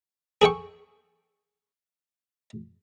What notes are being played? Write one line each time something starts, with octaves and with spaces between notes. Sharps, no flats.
G#4 A4 G5 C#6